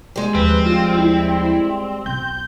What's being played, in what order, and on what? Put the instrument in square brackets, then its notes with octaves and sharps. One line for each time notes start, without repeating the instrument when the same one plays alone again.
[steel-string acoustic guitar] G3 G#3
[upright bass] D#2 F3 [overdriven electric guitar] C4 [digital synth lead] B4
[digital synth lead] F4
E4
[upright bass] B1 [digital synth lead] G6